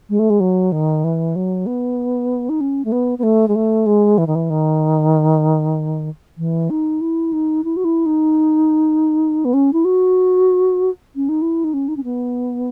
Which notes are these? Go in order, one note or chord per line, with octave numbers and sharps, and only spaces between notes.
G#3
A3
G#3
F#3
D#3
E3
F#3
B3
D#4
C#4
A3
B3
B3
A3
G#3
A3
G#3
E3
D#3
E3
D#3
E3
D#4
E4
D#4
E4
F#4
E4
D#4
B3
C#4
E4
F#4
C#4
D#4
E4
D#4
C#4
D#4
C#4
B3